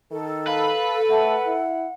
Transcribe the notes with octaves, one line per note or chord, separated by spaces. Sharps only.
D#3 A4
B4 F5
A3 F#5
E4